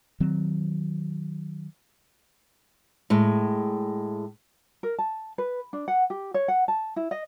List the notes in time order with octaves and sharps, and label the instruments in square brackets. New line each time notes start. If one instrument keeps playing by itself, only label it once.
[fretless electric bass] D#3 F#3 C4
[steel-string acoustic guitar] A2 G#3
[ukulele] A#4
A5
B4
D4
F#5
G4
C#5
F#5
A5
E4
D#5